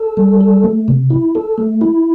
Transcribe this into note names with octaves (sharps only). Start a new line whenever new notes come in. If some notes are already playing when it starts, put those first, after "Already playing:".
Already playing: A4
G3
A4
A3
C3
E4
A4
A3
E4